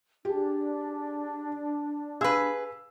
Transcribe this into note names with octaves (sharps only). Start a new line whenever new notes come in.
D4 G4 G#4
G#4 B4 F5 E6